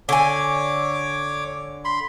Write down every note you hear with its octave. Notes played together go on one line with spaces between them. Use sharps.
D3 C#5 G#5 D6
B5 C6